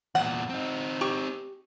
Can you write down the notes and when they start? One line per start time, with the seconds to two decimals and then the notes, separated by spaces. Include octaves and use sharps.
0.15 E2 A#2 F#5
0.50 C4 D#4
1.01 G4 C#6